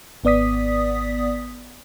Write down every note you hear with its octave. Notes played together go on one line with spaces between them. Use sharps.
G#1 B3 D5 D#6 B6